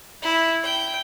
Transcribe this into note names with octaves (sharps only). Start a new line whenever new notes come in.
E4
G5